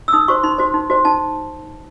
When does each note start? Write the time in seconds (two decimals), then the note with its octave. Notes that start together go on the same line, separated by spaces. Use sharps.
0.08 E6
0.13 D#4 D#6
0.28 F#4 C5 C#6
0.44 D#4 C6
0.58 F#4 C5
0.74 D#4
0.90 F#4 C5
1.05 D#4 A5